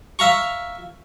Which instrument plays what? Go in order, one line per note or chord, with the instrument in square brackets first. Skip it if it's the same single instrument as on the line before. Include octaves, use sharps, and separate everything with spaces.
[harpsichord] E5 F5 A#5 C#6